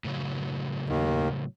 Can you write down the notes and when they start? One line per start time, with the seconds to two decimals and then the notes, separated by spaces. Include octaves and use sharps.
0.04 A2 C#3 F#3
0.89 D#2 D#3